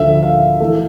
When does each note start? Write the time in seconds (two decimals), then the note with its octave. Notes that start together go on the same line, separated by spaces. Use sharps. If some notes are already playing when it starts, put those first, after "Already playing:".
Already playing: D2 D3 F3 A3 E5
0.23 F5
0.60 E3 A3